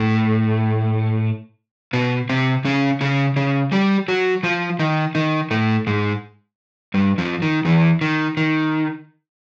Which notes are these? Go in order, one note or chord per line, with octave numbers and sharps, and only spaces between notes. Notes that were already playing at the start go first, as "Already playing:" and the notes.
Already playing: A2 A3
B2 B3
C3 C4
C#3 C#4
C#3 C#4
C#3 C#4
G3 G4
F#3 F#4
F3 F4
D#3 D#4
D#3 D#4
A2 A3
G#2 G#3
G2 G3
F2 F3
D#3
E2 E3
D#3
D#3